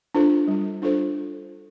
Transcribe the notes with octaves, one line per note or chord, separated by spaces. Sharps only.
D4 F4 A4 C5
G3
D4 F4 A4 C5